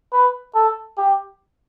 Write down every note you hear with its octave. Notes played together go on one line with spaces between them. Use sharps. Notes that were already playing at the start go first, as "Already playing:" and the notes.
B4
A4
G4